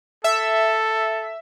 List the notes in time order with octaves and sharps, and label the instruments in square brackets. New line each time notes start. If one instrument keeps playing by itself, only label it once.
[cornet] A4 [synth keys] E5